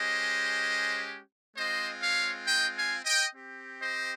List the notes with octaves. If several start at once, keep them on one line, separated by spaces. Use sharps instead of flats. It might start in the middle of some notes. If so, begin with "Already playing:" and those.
Already playing: G#3 C#4 G4 C5 D#5
G#3 C4 F4 C5 D#5
C#5 F5
D#5 G5
F5 G#5
D#5 G5
C4 G4
C5 D#5